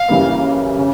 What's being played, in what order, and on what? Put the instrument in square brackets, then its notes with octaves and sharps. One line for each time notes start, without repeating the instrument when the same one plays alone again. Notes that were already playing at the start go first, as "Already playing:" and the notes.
Already playing: [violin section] F5
[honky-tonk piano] F#2 C#3 E3 G3 A#3
C#3